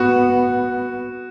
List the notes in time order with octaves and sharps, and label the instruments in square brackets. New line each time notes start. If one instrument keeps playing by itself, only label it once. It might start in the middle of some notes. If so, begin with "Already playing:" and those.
Already playing: [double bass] B3 [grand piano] F#4